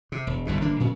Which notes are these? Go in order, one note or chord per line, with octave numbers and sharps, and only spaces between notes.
C3
E1
G1 C2 G2 B2
G1 D3 A#3 D4
A#2 C#3 F#3